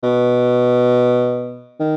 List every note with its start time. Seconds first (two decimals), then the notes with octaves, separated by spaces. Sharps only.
0.03 B2
1.80 D#3